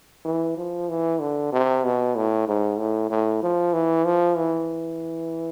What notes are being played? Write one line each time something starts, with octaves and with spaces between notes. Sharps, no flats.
E3
F3
E3
D3
C3
B2
A2
G#2
A2
A2
F3
E3
F3
E3